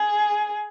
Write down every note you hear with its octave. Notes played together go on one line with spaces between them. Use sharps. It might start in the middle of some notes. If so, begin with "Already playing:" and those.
Already playing: G#4